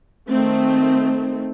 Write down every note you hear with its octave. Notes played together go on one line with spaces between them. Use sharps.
D#3 A3 C4